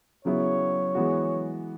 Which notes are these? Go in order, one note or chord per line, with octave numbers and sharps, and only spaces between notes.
C#3 F#3 B3 E4 C#5
E3 G#3 B3 F#4